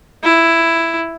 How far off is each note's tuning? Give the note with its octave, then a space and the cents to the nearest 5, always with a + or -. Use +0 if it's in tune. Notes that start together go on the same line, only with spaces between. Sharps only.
E4 +5